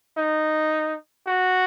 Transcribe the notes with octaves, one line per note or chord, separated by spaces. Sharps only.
D#4
F#4